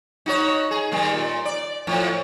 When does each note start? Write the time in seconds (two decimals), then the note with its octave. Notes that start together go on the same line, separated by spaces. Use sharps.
0.26 D#4 F#4 C#5
0.71 G#4
0.92 D#3 G3 A#3
1.12 A#2
1.45 D5
1.87 F2 A2